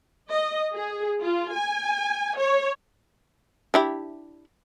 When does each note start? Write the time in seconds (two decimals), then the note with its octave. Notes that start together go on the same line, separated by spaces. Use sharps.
0.31 D#5
0.73 G#4
1.23 F4
1.53 G#5
2.38 C#5
3.74 D4 E4 G4